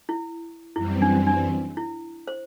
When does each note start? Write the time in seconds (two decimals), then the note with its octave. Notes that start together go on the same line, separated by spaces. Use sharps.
0.09 E4
0.76 F#2 E3 G3 C4 E4
1.02 D4
1.27 D4
1.77 E4
2.27 C5